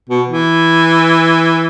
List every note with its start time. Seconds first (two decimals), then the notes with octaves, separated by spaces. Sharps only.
0.10 B2
0.29 E3